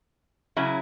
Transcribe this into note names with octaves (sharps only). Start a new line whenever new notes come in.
C#3 F#3 C#4 E4